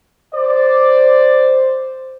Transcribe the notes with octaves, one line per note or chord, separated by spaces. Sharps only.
C5 D5